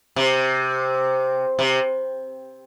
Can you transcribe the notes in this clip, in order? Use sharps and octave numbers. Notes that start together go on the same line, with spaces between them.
C3
C3